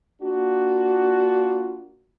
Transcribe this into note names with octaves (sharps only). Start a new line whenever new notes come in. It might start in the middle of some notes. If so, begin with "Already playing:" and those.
A#3 D4 F4 F#4